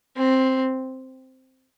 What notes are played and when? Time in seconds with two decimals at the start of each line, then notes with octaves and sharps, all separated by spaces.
0.16 C4